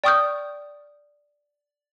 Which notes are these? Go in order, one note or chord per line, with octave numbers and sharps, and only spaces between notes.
D5 G5 C#6 D#6 F6 G6